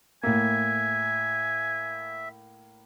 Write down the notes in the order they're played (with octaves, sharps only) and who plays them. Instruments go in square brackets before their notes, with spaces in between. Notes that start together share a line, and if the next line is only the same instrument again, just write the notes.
[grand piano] A2 A#3 [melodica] E5 [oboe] G#5